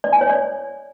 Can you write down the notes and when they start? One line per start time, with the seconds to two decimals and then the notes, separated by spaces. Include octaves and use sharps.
0.04 D5
0.13 G#5
0.21 C#5
0.30 D5